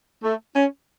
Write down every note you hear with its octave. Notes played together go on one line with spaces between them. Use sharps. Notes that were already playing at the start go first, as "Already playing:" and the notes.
A3
C#4